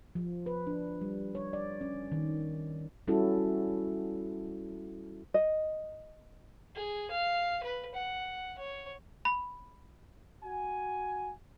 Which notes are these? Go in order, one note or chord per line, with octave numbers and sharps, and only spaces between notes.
F3
B4
D4
G3
C#5
D5
C#4
D#3
G3 C#4 E4 F#4 A4
D#5
G#4
F5
B4
F#5
C#5
B5
F#4 G#5